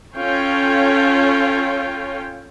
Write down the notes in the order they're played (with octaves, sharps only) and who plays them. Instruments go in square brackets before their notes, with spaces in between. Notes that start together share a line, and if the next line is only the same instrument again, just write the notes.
[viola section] C#4 F4 A4 C#5 G5